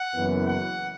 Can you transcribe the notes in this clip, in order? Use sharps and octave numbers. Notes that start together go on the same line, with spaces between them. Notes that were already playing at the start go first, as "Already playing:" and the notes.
Already playing: F#5
F#1 F#2 E3 B3
F#5